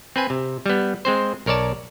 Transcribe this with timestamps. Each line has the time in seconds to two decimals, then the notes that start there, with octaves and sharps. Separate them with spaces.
0.16 C4 B4 G#5
0.30 C3
0.66 G3 B3
1.05 G#3 C4 C5
1.46 B1 A#4 C#5 D5 A5